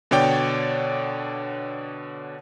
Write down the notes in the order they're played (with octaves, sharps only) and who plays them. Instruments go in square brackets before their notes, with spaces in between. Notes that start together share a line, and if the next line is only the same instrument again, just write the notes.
[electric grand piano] B2 D3 C#5 D5 G5